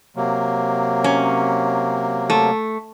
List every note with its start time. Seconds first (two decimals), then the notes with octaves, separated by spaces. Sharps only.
0.16 C3 F#3 A#3
1.04 C#4
2.30 A3